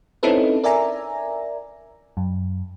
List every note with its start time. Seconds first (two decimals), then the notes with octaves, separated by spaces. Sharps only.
0.23 C4 C#4 D#4 E4 A4 B4
0.64 A#4 D5 E5 G#5 A#5
2.17 F#2